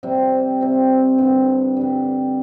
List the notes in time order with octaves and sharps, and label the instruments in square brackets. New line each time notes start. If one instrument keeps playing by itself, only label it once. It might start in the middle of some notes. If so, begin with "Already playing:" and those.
[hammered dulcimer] C3 G3 C4
C3 G3 C4
G2 D3 G3
G2 D3 G3